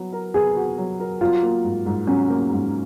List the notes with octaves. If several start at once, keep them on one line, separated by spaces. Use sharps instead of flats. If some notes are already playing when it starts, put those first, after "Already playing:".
Already playing: F#3 B3 F#4
A#4
B3 G#4
F#4
F#3
A#4
F#3 F4
A#3
G#2
G#2
F#3 C#4
A#3
G#2